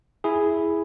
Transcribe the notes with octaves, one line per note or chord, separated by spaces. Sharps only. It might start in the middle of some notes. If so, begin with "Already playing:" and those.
E4 G#4